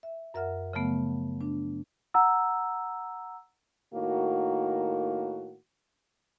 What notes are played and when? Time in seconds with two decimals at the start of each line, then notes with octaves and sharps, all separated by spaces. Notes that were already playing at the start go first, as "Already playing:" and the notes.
0.03 E5
0.34 F#2 A#4 E5 F#5 F6
0.73 C#3 F3 F#3 A3 B3
1.41 D4
2.14 F#5 A#5 E6
3.94 A2 D#3 A#3 F#4